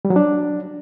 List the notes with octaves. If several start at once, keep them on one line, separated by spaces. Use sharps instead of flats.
G3
F#3
D4